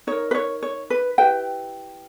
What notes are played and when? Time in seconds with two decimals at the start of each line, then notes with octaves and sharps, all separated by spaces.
0.07 D#4 A#4 C#5
0.31 B4
0.35 C#5
0.63 C#5
0.90 B4
1.18 E4 G4 B4 G5